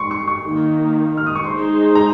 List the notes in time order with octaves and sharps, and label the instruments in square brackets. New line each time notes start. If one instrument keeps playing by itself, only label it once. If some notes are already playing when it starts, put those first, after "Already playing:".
Already playing: [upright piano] C6 C#6
C#6
C#6
[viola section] D#3 A#3 D#4
[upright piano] F6
D#6
C#6
[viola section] G#3 D#4 G#4 C5 [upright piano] C6
[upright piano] A#5